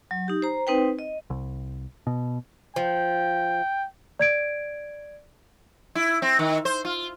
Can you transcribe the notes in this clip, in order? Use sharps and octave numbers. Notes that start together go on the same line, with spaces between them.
F#3
D#4 G4
C5 A#5
C4 D#4 B4 C5 G5
D#5
C2
B2
F3 G5
D5 G#6 D7
E4
C4
D#3
C5
F4